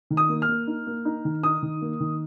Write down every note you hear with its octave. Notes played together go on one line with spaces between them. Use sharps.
D#3
D#6
A#3
F6
A#3
D#4
A#3
D#4
D#3
D#4 D#6
D#3
A#3
D#3